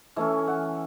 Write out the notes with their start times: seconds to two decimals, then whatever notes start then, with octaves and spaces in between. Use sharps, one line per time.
0.16 E3 A3 C#4 E5
0.47 F#5